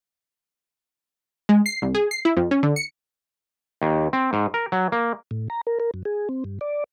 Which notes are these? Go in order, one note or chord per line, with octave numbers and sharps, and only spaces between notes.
G#3
C7
C2
G#4
C7
E4
F2
C#4
D3
C#7
D#2
C4
G#2
A#4
F#3
A#3
A2
A#5
A#4
A#4
F#2
G#4
C4
G2
D5